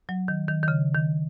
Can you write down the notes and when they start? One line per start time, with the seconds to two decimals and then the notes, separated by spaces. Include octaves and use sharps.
0.09 F#3
0.28 D#3
0.48 D#3
0.63 D#3
0.68 C#3
0.95 D#3